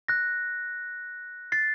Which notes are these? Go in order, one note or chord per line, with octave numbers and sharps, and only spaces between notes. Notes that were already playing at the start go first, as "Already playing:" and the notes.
F#6 A#6
A6 C7